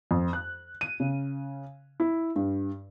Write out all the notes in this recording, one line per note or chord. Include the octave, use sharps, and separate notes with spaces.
F2
F#6
D#7
C#3
E4
G2